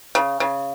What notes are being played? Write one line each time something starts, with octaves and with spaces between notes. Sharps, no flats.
C#3
C#3